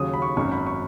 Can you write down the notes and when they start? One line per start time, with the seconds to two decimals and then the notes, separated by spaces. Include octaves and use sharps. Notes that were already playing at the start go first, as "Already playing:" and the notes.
Already playing: D#2 C#3 F#3 D#6
0.14 B5
0.22 C#6
0.37 G#1 F#2 F#3 C#6
0.52 B5
0.66 C#6